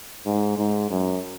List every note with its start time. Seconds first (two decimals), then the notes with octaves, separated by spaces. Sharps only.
0.26 G#2
0.58 G#2
0.90 F#2